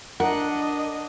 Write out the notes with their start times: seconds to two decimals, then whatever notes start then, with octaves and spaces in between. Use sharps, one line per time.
0.20 D4 A#4 D#5 F#5